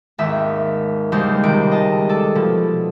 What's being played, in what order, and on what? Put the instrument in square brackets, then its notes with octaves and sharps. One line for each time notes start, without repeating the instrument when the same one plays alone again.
[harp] G#1 D#2 E5
D#2 C#3 G3 G#3 C5
C#2 C3 D#3 D7
D#5 A5
A4 D5
B2 F3